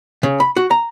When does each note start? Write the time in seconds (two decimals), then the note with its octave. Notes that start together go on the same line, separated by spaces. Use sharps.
0.23 C#3
0.40 B5
0.56 F#4
0.71 A#5